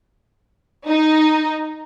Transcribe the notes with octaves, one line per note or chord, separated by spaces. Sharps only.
D#4